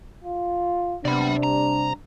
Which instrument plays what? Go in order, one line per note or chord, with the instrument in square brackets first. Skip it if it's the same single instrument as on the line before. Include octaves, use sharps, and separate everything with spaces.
[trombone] F4
[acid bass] C3 [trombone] B3 [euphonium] D4 [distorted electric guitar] D5 B5
[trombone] G3 [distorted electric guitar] A#5